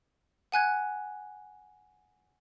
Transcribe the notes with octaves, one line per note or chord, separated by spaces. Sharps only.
F#5 G#5 F#6 G#6